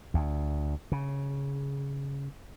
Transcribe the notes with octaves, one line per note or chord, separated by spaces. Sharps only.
D2
C#3